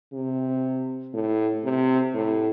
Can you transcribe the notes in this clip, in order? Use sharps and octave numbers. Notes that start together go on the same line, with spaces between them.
C3
A2
C3
A2